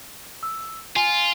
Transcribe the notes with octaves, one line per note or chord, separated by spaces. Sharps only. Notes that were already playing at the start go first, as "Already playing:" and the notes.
E6
F4 G#5